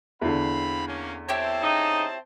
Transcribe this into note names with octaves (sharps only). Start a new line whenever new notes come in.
E2 D3 C4 F5 B5
A#3 C#4
C4 E4 G4 C5 C#5 A5
C#3 D#4